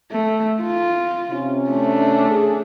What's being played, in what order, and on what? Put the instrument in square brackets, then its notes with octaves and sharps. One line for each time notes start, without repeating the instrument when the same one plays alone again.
[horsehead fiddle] A3
F4
[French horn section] C3 C#4
[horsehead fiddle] A3 D4
[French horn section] G#4